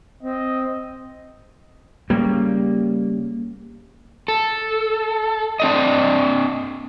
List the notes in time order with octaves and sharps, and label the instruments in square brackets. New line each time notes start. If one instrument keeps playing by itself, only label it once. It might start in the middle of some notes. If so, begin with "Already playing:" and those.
[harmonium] C4 [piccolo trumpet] D#5
[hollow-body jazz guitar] C#3 G3 [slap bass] A#3
[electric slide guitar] A4
C4 D4 D#5